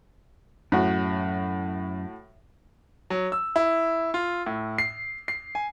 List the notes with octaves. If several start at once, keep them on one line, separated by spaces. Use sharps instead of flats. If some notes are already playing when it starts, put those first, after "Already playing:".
F#2 A2 F#4
F#3
E6
E4
F4
A2
C7
C7
G#5